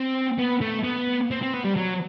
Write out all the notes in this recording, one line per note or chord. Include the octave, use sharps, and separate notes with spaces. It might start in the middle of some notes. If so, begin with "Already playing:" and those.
Already playing: C4
B3
A3
B3
C4
C4
B3
G3
F#3